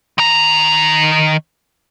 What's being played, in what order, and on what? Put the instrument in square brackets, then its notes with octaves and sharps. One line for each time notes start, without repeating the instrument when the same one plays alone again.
[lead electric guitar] D#3 A#5